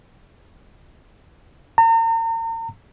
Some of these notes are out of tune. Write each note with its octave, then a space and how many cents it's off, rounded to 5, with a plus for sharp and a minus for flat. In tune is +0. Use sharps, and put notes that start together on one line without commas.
A#5 -40